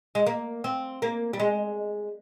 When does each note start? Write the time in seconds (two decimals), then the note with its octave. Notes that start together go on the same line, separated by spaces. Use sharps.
0.15 G#3
0.27 A#3
0.64 C4
1.02 A#3
1.33 G3
1.40 G#3